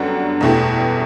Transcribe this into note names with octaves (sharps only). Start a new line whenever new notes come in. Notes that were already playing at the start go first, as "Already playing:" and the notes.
Already playing: F#2 D3 G3 B3 F#4
E2 B2 A3 E4 G4